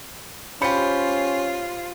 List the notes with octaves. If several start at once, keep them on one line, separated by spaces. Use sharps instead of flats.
C#4 F4 G4 C5 B5 C#7